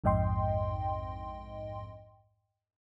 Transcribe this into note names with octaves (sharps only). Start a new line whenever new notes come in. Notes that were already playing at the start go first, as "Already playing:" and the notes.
A#1 F2 G#2 D#5 G5 C6